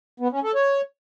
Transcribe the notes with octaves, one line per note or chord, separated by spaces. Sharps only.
B3
C#4
A4
C#5